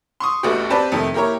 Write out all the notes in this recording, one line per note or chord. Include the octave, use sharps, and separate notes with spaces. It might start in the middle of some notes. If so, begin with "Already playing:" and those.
C6 C#6 D#6
A1 D2 A3 B3 F#4 G4
C4 G4 B4 D5 A5
F2 C3 D#3 A3
A#3 E4 G4 A#4 C#5